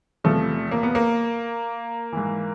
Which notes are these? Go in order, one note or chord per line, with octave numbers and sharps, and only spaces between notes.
E2 C3 F3 A3
A#3
B3
A#3
G#2 E3